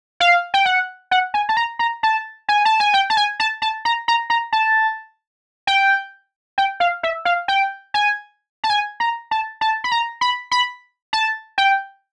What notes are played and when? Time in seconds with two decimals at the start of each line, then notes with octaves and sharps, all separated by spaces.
0.20 F5
0.54 G5
0.66 F#5
1.11 F#5
1.34 G#5
1.49 A5
1.57 A#5
1.79 A#5
2.03 A5
2.49 G#5
2.65 A5
2.80 G#5
2.94 G5
3.10 A5
3.17 G#5
3.40 A5
3.62 A5
3.85 A#5
4.08 A#5
4.30 A#5
4.53 A5
5.67 G5
6.58 G5
6.80 F5
7.03 E5
7.25 F5
7.48 G5
7.94 G#5
8.64 A5
8.70 G#5
9.00 A#5
9.31 A5
9.61 A5
9.84 B5
9.92 A#5
10.21 B5
10.51 B5
11.13 A5
11.58 G5